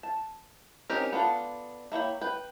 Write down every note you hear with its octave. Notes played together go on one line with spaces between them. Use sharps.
A5
C4 C#4 D#4 G4 A#4
B3 D4 F4 A4
A#3 E4 C#5 G5
B4 G5